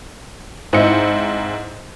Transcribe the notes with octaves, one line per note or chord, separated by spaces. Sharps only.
G#2 C4 D#4 E4 D#5 C#7